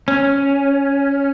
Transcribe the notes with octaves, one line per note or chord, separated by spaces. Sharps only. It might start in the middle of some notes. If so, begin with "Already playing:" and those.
C#4